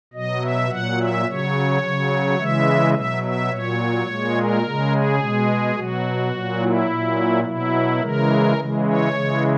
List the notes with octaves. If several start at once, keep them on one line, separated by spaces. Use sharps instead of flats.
B2 F#3 D#5
E5
A#2 F#3 F#5
E5
C#3 F#3 C#5
C#3 F#3
C#3 E3 G#3 E5
B2 F#3 E5
E5
A#2 F#3 C#5
A#2 G#3
A#4
C#3 G#3
G#4
B2 G#3
B2 F#3 F#4
A#2 F#3
E4
A#2 F#3
B2 F#3 E4
C#3 E3 G#3 A#4
C#3 E3 G#3
C#5
C#3 E3 G#3